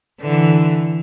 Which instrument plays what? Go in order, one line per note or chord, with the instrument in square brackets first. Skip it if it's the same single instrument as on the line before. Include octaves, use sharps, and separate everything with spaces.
[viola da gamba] D3 E3